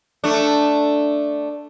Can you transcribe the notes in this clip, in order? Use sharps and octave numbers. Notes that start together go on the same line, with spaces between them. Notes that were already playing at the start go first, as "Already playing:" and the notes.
A3 D4